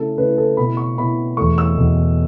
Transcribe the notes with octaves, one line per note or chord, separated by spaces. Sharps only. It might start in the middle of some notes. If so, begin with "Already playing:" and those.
Already playing: C#3 A3 E4 A4
C#3 A3 E4 B4
A4
B2 B3 E4 B5
C#6
B2 B3 E4 B5
E2 B2 A3 C#6
E6
E2 B2 A3